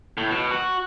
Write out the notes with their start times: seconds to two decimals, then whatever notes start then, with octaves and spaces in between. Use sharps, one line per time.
0.18 A2
0.31 B2
0.51 F#4